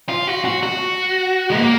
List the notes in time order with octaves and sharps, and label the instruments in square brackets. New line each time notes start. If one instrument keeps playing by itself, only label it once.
[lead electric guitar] F4
F#4
F#4
F#4
G#3
A#3